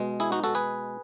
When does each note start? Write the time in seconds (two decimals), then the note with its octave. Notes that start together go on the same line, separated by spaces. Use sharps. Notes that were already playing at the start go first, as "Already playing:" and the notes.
Already playing: B2 G#3
0.20 E4 G#4
0.32 D#4 F#4
0.44 F#4 A4
0.55 G#4 B4